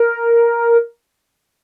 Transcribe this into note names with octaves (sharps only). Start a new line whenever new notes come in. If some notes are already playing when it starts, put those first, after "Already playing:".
Already playing: A#4